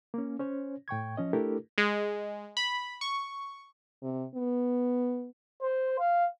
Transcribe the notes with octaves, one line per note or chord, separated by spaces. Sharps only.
A#3 C#4
C#4 C5 C#5
A2 G5 C#6 G#6
F3 C#4 D#5
A3 D4 E4 G4 A4 A#4
G#3
B5
C#6
C3
B3
C5
F5